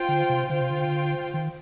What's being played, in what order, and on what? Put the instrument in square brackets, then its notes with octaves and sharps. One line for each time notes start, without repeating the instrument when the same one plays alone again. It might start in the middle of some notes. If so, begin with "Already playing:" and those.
Already playing: [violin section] F4 C5 G5
[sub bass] D3
C3
[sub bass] D3 [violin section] F4 C5 G5
[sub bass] C3
D3
D#3